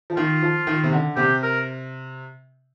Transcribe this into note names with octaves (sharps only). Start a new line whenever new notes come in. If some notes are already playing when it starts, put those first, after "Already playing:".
F3
D#3 F4
F3
D#3
C3
D3
C3 G4
A#4